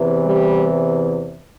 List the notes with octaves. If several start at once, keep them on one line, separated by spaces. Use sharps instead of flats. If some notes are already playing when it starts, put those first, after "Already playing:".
Already playing: E2 C3 E3
G3